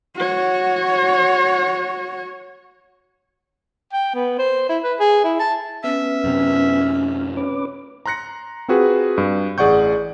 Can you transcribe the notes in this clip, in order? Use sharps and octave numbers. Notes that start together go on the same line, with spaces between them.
F#4 C#5
G5
B3
C5
E4
B4
G#4
E4
A5
B3 C#4 E5
F#2 C3
C#4 B4 D6
A#5 C6 F#6 A#6 C#7
C4 F4 F#4 G#4 B4
G2
A1 G#4 D5 F#5 C#6 G6